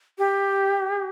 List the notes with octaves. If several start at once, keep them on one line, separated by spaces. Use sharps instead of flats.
G4